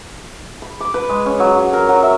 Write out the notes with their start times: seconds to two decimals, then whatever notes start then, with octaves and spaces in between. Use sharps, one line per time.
0.62 B5
0.80 D6
0.94 B4
1.09 G#3
1.26 C#4
1.40 F#3
1.57 F#4
1.73 A#4
1.89 F#3
2.03 E5